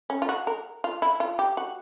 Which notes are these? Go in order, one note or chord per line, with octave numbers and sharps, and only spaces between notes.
C#4
F4
F#4
A#4
F4
E4
F4
G4
F#4